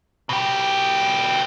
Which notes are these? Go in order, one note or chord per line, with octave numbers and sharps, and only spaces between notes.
B2 G4